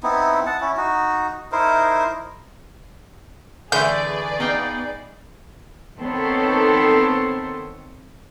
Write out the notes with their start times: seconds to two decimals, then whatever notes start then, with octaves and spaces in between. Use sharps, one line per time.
0.03 B3 C4 D#4 E4
0.46 F#5 A5
0.61 C#4 E4
0.77 D#4 F#4
1.52 D#4 E4 A#4 C5
3.72 D3 E3 A3 G#4 B4 D5 G6
4.40 B3 D#4 F5 G5
5.98 D#3 B3 C4 A4 C5 C#5